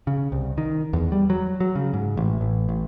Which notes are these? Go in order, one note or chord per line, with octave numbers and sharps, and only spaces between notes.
C#3
C2
D#3
E2
G3
F#3
F#3
C#3
G#2
A1
A1
A1